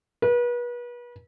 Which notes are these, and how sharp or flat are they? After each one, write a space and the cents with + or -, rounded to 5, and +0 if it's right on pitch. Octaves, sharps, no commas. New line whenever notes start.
B4 -35